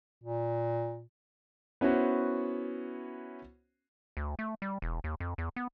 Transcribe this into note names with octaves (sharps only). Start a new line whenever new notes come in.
A#2
B3 C#4 E4 F#4 C5
D2
A3
G3
E1
D#2
F2
E2
B3